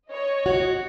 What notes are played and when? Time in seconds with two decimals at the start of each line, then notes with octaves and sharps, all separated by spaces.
0.11 C#5 D#5
0.46 F#4